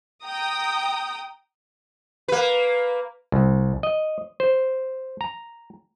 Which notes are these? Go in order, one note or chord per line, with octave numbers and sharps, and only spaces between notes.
G5 A#5 D#6
A#3 B4
C2
D#5
C5
A#5